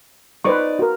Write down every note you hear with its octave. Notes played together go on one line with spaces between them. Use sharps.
D#4 B4 C5 D5 C#6
F#4 A#4